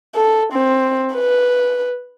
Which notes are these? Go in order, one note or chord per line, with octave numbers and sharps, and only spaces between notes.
A4
C4
B4